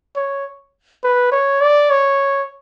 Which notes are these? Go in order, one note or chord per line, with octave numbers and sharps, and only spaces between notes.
C#5
B4
C#5
D5
C#5